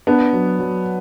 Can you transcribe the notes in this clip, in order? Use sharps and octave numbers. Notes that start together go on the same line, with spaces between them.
B3 D4
F#3
F#3